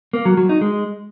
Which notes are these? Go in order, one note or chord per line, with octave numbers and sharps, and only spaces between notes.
A#3
F#3
F#3
D#4
G#3